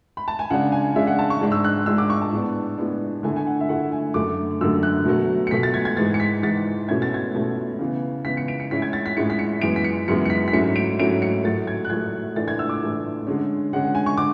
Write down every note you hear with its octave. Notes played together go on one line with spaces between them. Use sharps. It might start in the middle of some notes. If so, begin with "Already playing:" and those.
B5
A5
G#5
C#3 G#3 D4 F#5
G#5
C#3 G#3 D4 E5
F#5
A5
C#6
G#2 G#3 D4
E6
F#6
G#2 G#3 D4 E6
D6
C#6
A5
A2 G#3 B3 D4
A2 G#3 B3 D4
D3 A3 E4 G#5
G#5
F#5
E5
D3 A3 E4 F#5
G#5
F#2 D3 A3 D6
F#2 D3 A3 E6
F#6
B2 F#3 A3
C#7
B2 F#3 A3 B6
A6
G#6
G#6
G#2 E3 G#3 A6
C#7
B6
G#2 E3 G#3 A6
B2 A3 C#4 E4 G#6
A6
G#6
B2 A3 C#4 E4
C#3 E3 B3
C#3 E3 B3 B6
C#7
D7
C#7
A2 G#3 C#4 E4 B6
G#6
A6
B6
A2 G#3 C#4 E4 C#7
B6
C#7
F#2 E3 G#3 B3 D7
B6
C#7
F#2 E3 G#3 B3 C#7
C#7
B6
B6
G#2 F#3 A3 C#4 E4 C#7
D7
G#2 F#3 A3 C#4 E4 D7
C#7
A2 F#3 A3 A6
G#6
F#6
A2 F#3 A3 G#6
A2 E3 A3 D4 A6
G#6
E6
D6
A2 E3 A3 D4
D3 G#3 C#4
D3 G#3 C#4 F#5
F#5
G#5
C#6
D3 D6